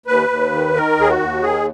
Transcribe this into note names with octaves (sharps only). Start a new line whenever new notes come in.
D#2 B4
D#2
D#3
D#3 A#4
D#2 G#4
F#4
D#2
D#3 G#4